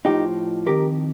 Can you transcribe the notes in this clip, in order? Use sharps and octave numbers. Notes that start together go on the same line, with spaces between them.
A2 F3 D#4 G4
F2 D#3 G4 A#4